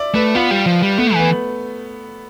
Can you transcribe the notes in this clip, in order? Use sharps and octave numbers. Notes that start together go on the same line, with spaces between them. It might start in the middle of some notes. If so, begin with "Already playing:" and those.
Already playing: D5 E5
A3 B4
B3 F4
G3
F3
G3
A3 B3
E3 B3